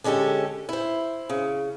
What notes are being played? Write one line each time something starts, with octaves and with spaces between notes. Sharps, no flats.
D3 G#3 C#4 G4 A4
E4 C5
C#3